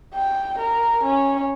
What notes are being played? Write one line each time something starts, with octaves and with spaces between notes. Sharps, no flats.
G5
A#4
C#4